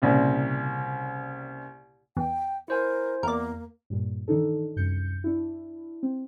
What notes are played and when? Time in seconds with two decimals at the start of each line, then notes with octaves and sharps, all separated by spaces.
0.02 C2 A#2 C#3
2.17 E2 G5
2.68 E4 A#4 C5 G#5
3.23 E2 A#3 A#4 D5
3.90 G2 A#2
4.28 D#3 E3 D4 D#4 A4
4.76 C2 F#2 G6 C#7
5.24 D4 E4
6.03 C4